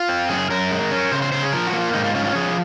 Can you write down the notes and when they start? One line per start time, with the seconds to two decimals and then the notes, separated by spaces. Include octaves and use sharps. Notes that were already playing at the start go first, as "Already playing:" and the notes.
Already playing: F4
0.09 C4
0.29 F#2 G#4
0.50 F#2 A#4
0.71 G#3
0.91 C#4
1.12 C#3 C5
1.22 C5
1.32 C#3 C5
1.43 G#4
1.52 F3 A#4
1.67 F#4
1.73 A#3
1.81 F4
1.94 G#2 D#4
2.04 F4
2.15 C#4 F4
2.25 F4
2.35 F3 G#4